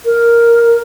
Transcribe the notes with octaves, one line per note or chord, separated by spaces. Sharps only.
A#4